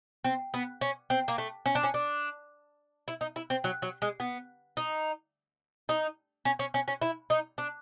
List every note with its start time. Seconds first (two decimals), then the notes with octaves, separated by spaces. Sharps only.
0.24 C4
0.54 B3
0.81 C#4
1.10 C4
1.28 A#3
1.38 A3
1.66 C#4
1.75 D4
1.83 C#4
1.94 D4
3.08 E4
3.21 D#4
3.36 E4
3.50 C4
3.64 F#3
3.82 F#3
4.02 G#3
4.20 B3
4.77 D#4
5.89 D#4
6.45 C#4
6.59 C#4
6.74 C#4
6.88 C#4
7.02 E4
7.30 D#4
7.58 D4